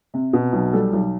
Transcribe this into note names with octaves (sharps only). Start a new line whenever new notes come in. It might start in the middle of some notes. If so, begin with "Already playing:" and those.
C3
B2
B1
G3 A4
B1